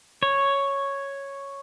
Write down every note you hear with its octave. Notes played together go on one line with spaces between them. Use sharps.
C#5